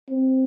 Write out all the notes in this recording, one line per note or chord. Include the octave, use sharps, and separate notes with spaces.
C4